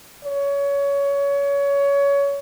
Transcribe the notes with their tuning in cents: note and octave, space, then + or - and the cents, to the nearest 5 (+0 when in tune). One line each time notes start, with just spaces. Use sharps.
C#5 +25